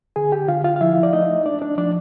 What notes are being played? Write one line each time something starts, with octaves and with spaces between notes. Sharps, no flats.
D3 G#4 G#5
G4 G5
D3 F4 F5
F4 F5
F5
F3 E4 E5
D5
A3 D#4 D#5
D4 D5
D4 D5
F3 D4 D5